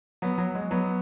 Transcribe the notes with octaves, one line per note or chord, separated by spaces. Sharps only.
F#3 B3
F#3
G#3
F#3 B3